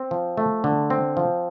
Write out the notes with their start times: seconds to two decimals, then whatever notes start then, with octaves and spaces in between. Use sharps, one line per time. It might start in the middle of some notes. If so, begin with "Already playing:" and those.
Already playing: C4
0.11 F3
0.37 A3
0.64 D3
0.90 C4
1.17 F3